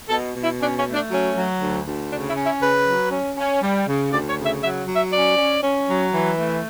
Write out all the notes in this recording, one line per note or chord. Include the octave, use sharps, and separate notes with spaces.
B2 A4
B2
E4
C#4 D4
C#4
A3
D4
F#3 C#4
F#3
D2
D2
C#3 D4
E4
C#4
E4
C#3 B4
F#3
C#4
C#4
G3
C#3
D2 D5
C#5
C#3
E5
F#3 E5
F#3
E5
C#4 D5
C#4
C#4
F#3
E3
A3